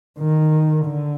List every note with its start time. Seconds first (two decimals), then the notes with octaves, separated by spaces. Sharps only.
0.18 D#3
0.86 D3